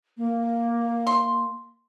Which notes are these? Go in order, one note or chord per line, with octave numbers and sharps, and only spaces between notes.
A#3
C6